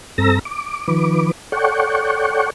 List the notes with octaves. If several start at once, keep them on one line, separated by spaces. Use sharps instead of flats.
G2 C4 A4 A#5 E6 A#6
D6
D#3 F3 B4 D6
A4 C#5 D5 F#5 G5 C#6